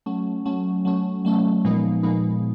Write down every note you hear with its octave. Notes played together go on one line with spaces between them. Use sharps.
F#3 A3 C#4
F#3 A3 C#4
F#3 A3 C#4
F#3 A3 C#4
A#2 F3 G#3 B3 D#4
A#2 F3 G#3 B3 D#4